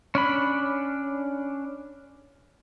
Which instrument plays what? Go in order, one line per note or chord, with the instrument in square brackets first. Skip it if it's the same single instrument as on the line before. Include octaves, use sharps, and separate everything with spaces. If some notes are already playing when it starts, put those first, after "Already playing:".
[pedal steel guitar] C#4 D4 B5